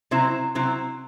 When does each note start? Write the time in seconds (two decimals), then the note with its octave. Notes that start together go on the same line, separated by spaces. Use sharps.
0.11 C3 F#3 C4 E4
0.55 C3 F#3 C4 E4